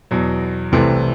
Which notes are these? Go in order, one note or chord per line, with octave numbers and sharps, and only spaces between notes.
E2 B2 F#3
C2 C3 E3 A3 C4